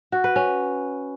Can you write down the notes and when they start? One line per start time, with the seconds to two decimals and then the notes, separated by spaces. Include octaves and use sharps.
0.12 F#4
0.24 B4
0.36 C#4